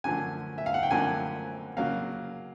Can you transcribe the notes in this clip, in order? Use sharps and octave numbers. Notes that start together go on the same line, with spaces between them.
F#2 D3 F3 A3 G#5
E5
F5
F#5
G5
F#2 D3 F3 A3 G#5
C#3 F#3 A#3 F5